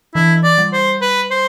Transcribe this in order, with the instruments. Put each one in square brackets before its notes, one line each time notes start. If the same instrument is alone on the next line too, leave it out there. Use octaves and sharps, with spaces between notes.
[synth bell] E3 [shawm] E4
[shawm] D5
[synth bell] G3
[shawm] C5
B4
C5